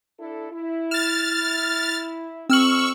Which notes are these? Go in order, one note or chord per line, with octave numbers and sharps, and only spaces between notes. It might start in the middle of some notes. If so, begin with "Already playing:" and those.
D4 E4 A4
E4
F6 A6 E7
F2 C4 C#6 E6 F6 F#7